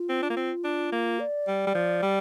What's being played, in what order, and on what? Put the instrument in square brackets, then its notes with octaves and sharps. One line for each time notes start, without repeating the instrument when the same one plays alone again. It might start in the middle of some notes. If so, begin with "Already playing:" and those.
Already playing: [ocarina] F4
[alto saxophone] C4
D4
A#3
C4
D4
A#3
[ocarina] D5
[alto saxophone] G3
G3
F3
G3